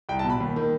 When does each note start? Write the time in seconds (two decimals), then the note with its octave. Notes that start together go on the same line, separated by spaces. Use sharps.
0.09 C2 G5
0.19 A5
0.24 B2
0.30 B5
0.40 D#2
0.56 D#3